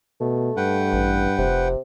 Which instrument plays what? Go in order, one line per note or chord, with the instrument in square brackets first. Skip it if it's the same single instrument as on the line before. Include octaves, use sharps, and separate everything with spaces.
[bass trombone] B2 [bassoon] A3
[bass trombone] G2 [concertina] B4 F#5 G5
[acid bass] A1
[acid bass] F1 [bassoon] C3